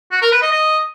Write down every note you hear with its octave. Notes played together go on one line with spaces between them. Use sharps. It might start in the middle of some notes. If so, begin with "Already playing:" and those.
F#4
A#4
B4
D#5
D#5